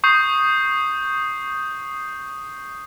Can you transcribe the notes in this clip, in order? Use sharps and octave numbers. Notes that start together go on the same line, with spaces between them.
C#6 D#6 G6 C7